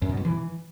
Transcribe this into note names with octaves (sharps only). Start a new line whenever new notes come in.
F#2
B2
G2
E3